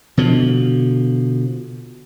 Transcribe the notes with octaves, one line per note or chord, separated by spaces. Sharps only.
B2 D3 F3